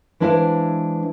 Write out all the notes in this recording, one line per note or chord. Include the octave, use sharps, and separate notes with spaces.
E3 G#3 D4 E4 C5 F5